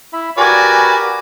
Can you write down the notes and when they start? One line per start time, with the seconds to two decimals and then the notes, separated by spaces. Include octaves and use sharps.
0.13 E4 E5 B5
0.38 F#4 G4 A#4 B4 D5 G#5